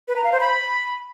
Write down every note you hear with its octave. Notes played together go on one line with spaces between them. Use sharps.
B4
A#5
F5
C5
B5